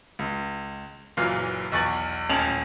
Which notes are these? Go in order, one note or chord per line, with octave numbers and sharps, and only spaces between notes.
C#2
F#1 A#2 E3 F#3 F5
B1 E2 C#6 A6 F#7
D#1 A1 C#4 A5 F7 F#7